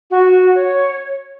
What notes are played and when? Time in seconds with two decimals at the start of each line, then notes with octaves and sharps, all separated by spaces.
0.11 F#4
0.55 C#5